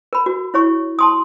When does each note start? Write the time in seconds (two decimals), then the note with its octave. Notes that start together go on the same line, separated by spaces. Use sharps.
0.13 A#4 B5
0.26 F#4
0.54 E4 C#5 C#6
0.99 A5 C6 D#6